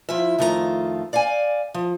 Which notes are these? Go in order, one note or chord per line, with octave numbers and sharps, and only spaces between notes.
F3 E4 F4 E5
F2 D#3 A3 F4 G4 A#5
D5 F5 G5 G#5
F3